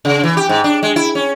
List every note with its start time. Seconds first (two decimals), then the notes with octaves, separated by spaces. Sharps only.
0.05 C#3
0.23 E3
0.37 G4
0.49 G#2
0.64 D4
0.83 G#3
0.96 E4
1.15 C#4